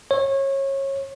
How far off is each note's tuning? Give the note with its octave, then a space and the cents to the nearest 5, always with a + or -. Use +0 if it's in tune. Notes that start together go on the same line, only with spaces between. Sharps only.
C#5 -25